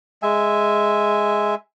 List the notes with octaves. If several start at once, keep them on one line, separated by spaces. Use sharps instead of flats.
G#3 E5 G#5